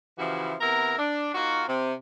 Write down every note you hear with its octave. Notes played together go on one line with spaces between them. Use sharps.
C#3 E3 F3 E4 F#4 G4
C3 B3 E4 A#4 A#5
D4
A#3 D#4 F4 F#4
C3